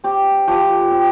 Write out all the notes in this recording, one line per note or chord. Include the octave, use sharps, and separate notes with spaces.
C4 G4
F3 G4
C4